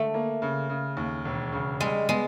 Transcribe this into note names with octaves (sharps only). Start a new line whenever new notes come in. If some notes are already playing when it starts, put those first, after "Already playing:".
Already playing: D3 A3
A#3
C#3
C#3
D#2
E1
C#3
G3 G#3
G#3 B3